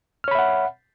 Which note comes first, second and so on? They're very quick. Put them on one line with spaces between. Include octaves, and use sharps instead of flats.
F6 C#5 B5 E5 F#5